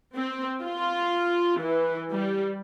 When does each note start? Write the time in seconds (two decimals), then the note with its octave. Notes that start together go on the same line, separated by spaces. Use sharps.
0.17 C4
0.63 F4
1.60 E3
2.11 G3